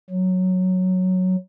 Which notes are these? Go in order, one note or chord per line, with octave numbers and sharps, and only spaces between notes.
F#3